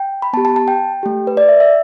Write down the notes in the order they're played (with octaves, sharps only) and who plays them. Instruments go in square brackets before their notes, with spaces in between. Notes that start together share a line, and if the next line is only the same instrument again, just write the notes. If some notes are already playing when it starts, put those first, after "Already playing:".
Already playing: [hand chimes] G5
B5
B3 A5
G4
A5
A5
G5
A3 G4
B4
D5
E5
E5